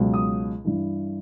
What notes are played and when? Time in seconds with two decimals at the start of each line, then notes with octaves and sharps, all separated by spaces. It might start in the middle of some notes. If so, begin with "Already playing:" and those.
Already playing: C#2 B2 F#3
0.14 D#6
0.65 G2 E3